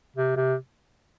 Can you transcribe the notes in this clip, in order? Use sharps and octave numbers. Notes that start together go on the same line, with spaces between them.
C3
C3